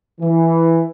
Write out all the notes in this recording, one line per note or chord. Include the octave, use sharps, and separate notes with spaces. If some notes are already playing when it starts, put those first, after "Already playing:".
E3